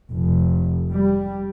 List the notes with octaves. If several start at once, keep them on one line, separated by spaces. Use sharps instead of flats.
F1
G3